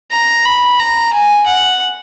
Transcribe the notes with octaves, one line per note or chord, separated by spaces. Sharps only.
A#5
B5
A#5
G#5
F#5